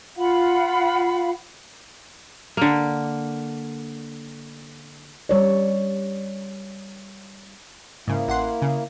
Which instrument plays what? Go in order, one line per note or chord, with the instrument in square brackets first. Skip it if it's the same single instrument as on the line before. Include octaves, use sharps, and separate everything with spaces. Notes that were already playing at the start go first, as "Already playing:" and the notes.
[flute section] F4 F5 F#5 B5
[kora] D3 A#3
[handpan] G3 C#5 D5
[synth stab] G#2 C#3 [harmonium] A#3 E4
[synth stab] A1 F#5 C6
C#3